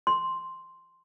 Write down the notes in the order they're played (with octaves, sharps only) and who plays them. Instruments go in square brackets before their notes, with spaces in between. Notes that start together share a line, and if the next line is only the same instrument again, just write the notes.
[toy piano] C6